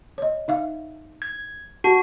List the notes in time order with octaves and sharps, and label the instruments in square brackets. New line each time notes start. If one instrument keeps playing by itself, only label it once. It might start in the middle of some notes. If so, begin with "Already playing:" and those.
[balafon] C#5 D#5
D#4 E5 F5
[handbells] G#6
[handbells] F#4 [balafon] A5